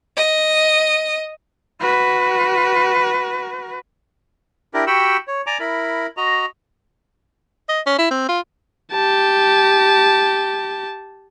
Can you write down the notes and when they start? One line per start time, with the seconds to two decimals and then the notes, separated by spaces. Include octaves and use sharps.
0.16 D#5
1.81 F#4 B4
4.74 D4 E4 G4 A#4
4.87 F#4 G4 F#5 G5 B5 E6
5.28 C#5
5.47 D5 G#5 A#5 D6
5.60 E4 A#4 B5
6.17 F#4 D#5 A#5
7.69 D#5
7.87 C#4
7.98 E4
8.11 C4
8.29 F4
8.92 G4 A5